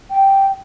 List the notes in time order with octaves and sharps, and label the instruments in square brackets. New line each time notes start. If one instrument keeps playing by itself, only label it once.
[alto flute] G5